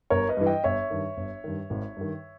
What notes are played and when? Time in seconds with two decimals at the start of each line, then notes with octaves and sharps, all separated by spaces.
0.10 G1 A#4 C#5
0.29 B4 D#5
0.37 G2 E3
0.46 D#5 G5
0.64 G1 C#5 E5
0.90 G2 D#3
1.17 G1
1.44 G2 D#3
1.70 G#1
1.97 G2 D#3